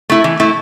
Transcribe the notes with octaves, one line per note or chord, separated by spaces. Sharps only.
A3 E4
E3
A3 E4